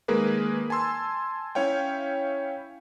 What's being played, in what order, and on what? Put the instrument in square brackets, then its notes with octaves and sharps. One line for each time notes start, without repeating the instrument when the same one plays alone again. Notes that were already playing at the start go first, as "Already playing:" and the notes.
[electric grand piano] D#3 G#3 A#3 G#4 A#4 B4
G#5 A5 C6 E6
C#4 E4 C#5 F5 G5